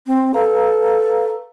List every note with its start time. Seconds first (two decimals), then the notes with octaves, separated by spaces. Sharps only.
0.07 C4
0.34 A4 B4 F5 A#5